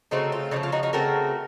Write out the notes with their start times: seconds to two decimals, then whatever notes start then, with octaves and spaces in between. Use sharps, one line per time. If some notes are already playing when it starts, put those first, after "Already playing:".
0.11 C#3 A3 C4 D#4 F#4
0.32 F4
0.51 C#3 F3 A3 D#4
0.63 F4
0.72 D#4 F#4
0.83 D#4 F#4
0.93 C#3 A3 C4 F#4 A#4